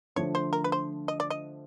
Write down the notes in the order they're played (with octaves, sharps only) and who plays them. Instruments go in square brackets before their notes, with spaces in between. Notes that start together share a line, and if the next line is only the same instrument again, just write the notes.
[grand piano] D3 F3 A3 D4 [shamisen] C#5
[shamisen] C5
A#4
B4
C5
D#5
D5
D#5